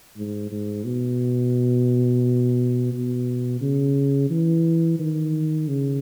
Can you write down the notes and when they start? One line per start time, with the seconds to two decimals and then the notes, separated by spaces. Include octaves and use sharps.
0.17 G#2
0.51 G#2
0.85 B2
2.93 B2
3.61 C#3
4.30 E3
4.99 D#3
5.68 C#3